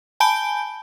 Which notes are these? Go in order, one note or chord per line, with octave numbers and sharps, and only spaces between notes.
G#5 A5 B5 G6 D7 G7